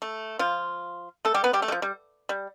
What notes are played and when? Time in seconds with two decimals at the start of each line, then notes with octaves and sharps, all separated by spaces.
0.02 A3
0.39 F3 F4
1.25 A3 A4
1.34 G3 G4
1.44 B3 B4
1.53 G3 G4
1.62 A3
1.68 G3
1.72 F3
1.82 G3
2.29 G3